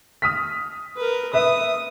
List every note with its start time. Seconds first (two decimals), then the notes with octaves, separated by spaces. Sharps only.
0.22 D#6 F6 B6
0.97 A#4 B4
1.33 B4 E5 D#6